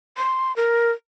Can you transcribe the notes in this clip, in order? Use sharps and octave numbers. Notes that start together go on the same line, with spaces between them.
C6
A#4